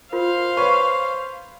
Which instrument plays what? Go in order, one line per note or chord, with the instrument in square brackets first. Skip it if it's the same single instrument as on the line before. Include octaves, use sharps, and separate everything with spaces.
[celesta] F4 A#4 [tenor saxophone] C5 [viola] F5
[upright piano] B4 C#5 [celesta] C#6